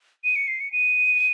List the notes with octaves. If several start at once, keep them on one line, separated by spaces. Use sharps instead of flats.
D#7
C#7
C7
C#7
D#7